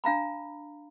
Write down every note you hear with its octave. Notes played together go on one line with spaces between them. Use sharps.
D4 F5 A#5 B5